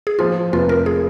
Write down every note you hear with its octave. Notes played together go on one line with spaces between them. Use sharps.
G#4
F3 F4
F1 F4
A#4
G#4